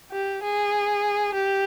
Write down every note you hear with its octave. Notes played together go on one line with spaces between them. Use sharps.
G4
G#4
G4